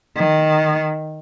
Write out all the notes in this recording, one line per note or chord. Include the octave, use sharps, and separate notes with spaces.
D#3